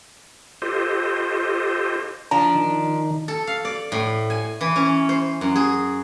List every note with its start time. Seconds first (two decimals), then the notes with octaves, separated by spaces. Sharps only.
0.62 F4 G4 A4 C5 D#5
2.31 F3 D4 A#5
2.55 D#3
3.28 A4
3.47 F5
3.65 D5
3.92 A2
4.30 G#5
4.61 E3
4.76 C#4
5.09 C5
5.41 F#2
5.56 G#4